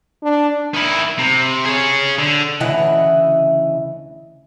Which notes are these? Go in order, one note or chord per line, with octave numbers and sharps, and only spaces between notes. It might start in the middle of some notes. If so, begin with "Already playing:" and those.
D4
D#3 E4
C3
G#4 C#5
D3
D2 C#3 E3 E4 D#5 F#5